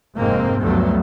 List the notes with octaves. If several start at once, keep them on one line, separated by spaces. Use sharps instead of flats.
F1 G#2 G#3 A#3 C4
D2 G2 F3 F#3 A3 B3